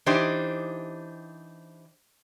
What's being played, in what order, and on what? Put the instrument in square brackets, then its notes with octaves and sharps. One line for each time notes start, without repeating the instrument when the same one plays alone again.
[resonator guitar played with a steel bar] E3 D4 D#4 G4 C5